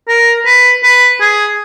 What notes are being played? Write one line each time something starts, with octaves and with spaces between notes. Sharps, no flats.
A#4
B4
B4
G#4